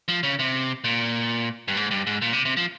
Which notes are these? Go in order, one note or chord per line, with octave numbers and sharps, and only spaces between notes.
F3
C#3
C3
A#2
G2
G#2
G2
G#2
A#2
C3
C3
F3